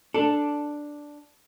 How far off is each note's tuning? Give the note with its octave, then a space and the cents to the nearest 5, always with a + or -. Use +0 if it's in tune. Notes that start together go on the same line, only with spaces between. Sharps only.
D4 +0 A4 +0